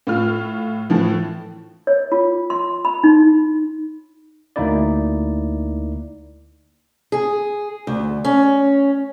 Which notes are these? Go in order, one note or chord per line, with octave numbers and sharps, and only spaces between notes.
A2 F4 F6
A2 E3 F3
C#5
F4
C6
B5
D#4
D2 A#3 D#4 E4 D5
G#4
D2
C#4